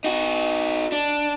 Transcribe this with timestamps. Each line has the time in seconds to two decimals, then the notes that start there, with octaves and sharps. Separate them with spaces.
0.04 D#4 F#4
0.92 D4